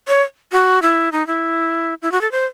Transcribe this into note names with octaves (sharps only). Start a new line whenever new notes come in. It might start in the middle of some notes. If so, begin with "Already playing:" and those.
C#5
F#4
E4
D#4
E4
E4
F#4
A4
C5